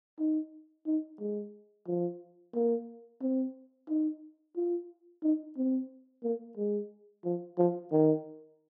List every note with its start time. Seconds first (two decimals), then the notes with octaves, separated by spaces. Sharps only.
0.19 D#4
0.86 D#4
1.19 G#3
1.87 F3
2.54 A#3
3.21 C4
3.88 D#4
4.55 F4
5.22 D#4
5.57 C4
6.23 A#3
6.57 G#3
7.24 F3
7.58 F3
7.91 D#3